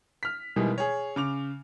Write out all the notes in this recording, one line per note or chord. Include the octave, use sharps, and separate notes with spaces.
F6 B6
B2 D#3 E3 G3 G#3
G#4 C#5
C#3 D6 F7